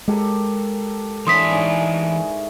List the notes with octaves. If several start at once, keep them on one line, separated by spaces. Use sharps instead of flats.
G#3 G4 A4 A#4
E3 D4 E4 C#5 G#5 C6 D#6 B6
G#2 G#4 C#6